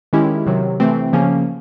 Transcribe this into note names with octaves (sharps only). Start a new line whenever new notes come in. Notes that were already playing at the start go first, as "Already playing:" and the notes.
D#3 G#3 C#4 E4 G4
C3 D#3 F#3
C3 E3 A3 C4
C#3 F3 A#3 C#4